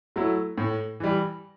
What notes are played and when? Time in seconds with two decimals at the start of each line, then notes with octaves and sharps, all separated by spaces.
0.16 F#3 A3 E4
0.58 A2
1.00 E3 G3